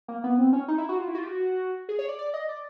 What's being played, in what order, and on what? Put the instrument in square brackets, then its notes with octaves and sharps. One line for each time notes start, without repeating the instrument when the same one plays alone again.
[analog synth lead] A#3
B3
C4
C#4
D#4
E4
F#4
F4
E4
F#4
F4
G4
F#4
G#4
C#5
D5
D5
D#5
D5